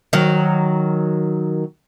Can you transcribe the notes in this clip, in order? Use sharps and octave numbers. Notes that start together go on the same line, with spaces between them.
D#3 F#3